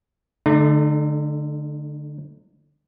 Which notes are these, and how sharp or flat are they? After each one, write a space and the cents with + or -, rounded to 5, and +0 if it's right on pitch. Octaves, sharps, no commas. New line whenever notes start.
D3 +0 A3 -20 D#4 -40